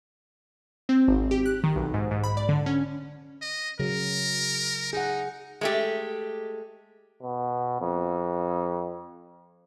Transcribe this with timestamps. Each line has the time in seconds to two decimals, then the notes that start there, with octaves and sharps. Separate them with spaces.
0.89 C4
1.08 G#1
1.31 G4
1.46 F#6
1.64 D#3
1.76 B1
1.94 G#2
2.11 G#2
2.24 B5
2.37 D5
2.49 D3
2.66 C#4
3.42 D#5
3.80 C#3 F#3 A#4
4.93 D#4 G#4 F#5
5.61 G#3 A3 G4
7.22 B2
7.81 F2